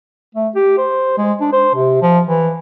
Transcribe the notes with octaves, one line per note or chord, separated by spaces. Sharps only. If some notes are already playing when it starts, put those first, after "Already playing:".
A3
G4
C5
G#3
D4
C5
C3
F3
E3